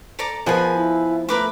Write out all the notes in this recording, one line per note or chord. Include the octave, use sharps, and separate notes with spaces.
A4 D5 A#5
F3 B3 G#4 A#4 B4 D#5 G#5
E4
A3 A#4 B4 D6